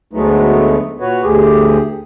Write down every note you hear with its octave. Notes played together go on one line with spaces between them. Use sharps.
D2 F#3 G#3 A3 B3 D#4
A#2 F#4 B4 C#5
D2 A2 G4 G#4